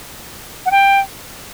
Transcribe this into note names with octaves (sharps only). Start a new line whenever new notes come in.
F#5
G5